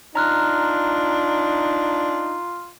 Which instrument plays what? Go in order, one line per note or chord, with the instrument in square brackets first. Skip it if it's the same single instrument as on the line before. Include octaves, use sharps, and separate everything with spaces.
[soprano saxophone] D4 [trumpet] D#4 [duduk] F4 [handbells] A#5 F6 F#6